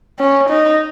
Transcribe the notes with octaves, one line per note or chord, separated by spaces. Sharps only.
C#4
D#4